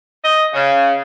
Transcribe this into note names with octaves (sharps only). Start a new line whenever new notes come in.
D#5
C#3